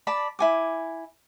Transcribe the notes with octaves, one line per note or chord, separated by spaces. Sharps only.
D5 A5 B5
E4 G#5 D6